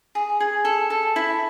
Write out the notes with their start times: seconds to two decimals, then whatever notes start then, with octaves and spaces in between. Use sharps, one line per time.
0.15 G#4
0.40 G#4
0.65 A4
0.90 A4
1.16 E4